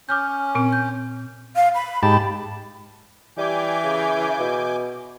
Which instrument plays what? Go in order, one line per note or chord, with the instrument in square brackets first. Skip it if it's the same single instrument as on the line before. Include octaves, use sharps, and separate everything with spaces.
[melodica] C#4 [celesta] D6 F6 G6
[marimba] A#2 C4
[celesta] G6
[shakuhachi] F5
B5
[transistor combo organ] G#2 G4 A5
[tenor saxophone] E3 [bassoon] G3 [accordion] G#5 D6 G6
[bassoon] C#3
B2